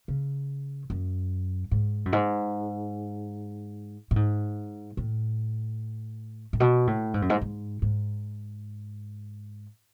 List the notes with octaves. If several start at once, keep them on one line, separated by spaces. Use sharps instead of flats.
C#3
F#2
G#2
F#2
G#2
A2
G#2
A2
A2
B2
A2
G#2
F#2
G#2
G#2
G#2